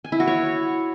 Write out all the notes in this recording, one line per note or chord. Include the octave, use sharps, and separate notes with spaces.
G#5
E4
F#4
C#5